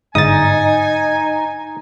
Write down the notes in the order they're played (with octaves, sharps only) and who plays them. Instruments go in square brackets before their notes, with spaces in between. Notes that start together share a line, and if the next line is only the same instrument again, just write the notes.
[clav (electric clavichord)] G1 G#2 [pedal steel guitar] D#4 [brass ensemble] G#5 [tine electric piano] D#6 A6